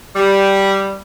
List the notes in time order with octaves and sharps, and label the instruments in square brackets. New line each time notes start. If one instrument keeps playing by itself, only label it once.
[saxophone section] G3